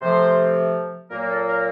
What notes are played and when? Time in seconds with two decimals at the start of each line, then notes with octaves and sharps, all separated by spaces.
0.01 C3 F3 A3 C5
1.10 A#2 F#3 A#3 A#4
1.30 A4
1.47 A#4